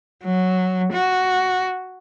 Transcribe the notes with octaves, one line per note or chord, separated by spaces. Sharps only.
F#3
F#4